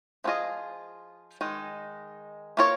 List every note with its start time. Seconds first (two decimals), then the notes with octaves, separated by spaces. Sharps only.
0.24 F3 C4 F4 G#4 D#5
1.41 D#3 G#3 D#4
2.57 A#3 F4 A#4 C#5